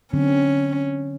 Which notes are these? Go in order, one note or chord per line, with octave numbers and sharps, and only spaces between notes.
D3 F#3 C4 C#4